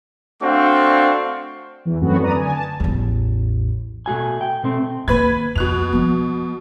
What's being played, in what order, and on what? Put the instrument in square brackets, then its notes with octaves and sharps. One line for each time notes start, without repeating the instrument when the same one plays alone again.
[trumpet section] A3 C4 D4 F#4 F5 C#6
[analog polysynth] E2 E3
F#2 A3 B3 C4 F#4
B4 D5 A#5 D#6
D3 G#5
A5
[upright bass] A1 E2
[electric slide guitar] B2 A3 F#4 G#5
G5
B2 A3 C4
[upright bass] D#3 A#3 [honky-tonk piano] B4 B5 G#6
[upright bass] F2 C4 [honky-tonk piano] B2 F#6 F7
[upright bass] F3 B3